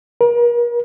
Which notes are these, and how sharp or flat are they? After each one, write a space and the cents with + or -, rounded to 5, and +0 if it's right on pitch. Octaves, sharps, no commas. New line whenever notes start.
A#4 +40